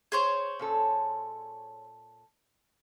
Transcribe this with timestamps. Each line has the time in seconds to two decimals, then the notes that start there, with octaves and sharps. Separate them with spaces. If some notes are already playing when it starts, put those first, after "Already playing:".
0.12 G#4 C5 C#5
0.59 A#2 C#4 A4